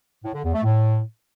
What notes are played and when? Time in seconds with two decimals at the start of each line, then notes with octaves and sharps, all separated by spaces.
0.24 A2
0.34 D3
0.44 E2
0.54 A3
0.64 A2